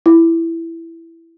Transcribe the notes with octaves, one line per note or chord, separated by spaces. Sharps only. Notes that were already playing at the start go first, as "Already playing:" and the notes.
E4